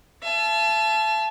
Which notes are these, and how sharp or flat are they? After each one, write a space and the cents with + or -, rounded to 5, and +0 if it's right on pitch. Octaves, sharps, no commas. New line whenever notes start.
E5 +40 A5 -20